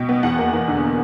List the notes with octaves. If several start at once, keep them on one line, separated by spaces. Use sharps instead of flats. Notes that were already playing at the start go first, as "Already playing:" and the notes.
Already playing: B2 G5
B3
E2 F#5
A#3
E2
D3